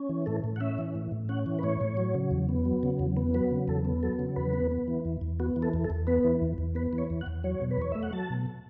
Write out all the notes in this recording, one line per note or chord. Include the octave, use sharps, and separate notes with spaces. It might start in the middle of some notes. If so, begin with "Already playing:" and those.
Already playing: C#4
E3
A2 A4
A2
F#5
C#4 E5
E3
A2
A2
C#4 F#5
E3
B4
A2 C#5
A2
F#3
C#3
E2
B3
F#3
C#3
E2
B3
F#3 B4
C#3
E2 A4
B3
F#3 A4
C#3
E2 B4
B3
B3
E3
E2
E2
B3 F#4
E3
A4
E2
A4
E2
B3 B4
E3
E2
E2
B3 B4
E3
C#5
E2
F#5
E2
F#3 C#5
B2
B4
E2 C#5
A3 E5
F#5
F#3 A5
B2